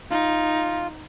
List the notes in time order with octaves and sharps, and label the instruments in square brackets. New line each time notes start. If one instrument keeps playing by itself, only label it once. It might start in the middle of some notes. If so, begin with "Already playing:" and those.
[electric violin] D#4 [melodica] F4